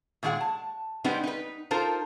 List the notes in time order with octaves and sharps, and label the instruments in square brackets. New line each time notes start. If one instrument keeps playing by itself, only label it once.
[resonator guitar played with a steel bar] A#2 D#3 G#3 G#4 F#5
A5
G3 G#3 B3 C4 D#4 G4
D#4 B4
D#4 F4 A4 A#4 C5